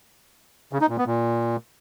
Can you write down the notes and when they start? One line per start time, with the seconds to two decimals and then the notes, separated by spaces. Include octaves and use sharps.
0.73 C#3
0.81 D#4
0.90 A#2
0.98 B3
1.06 A#2